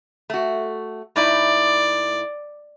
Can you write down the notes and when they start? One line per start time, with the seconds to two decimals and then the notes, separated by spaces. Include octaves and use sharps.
0.30 A3 F#4
1.16 A2 D#4 E4 D5